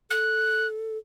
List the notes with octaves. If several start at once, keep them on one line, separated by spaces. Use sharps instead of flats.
A4 F#6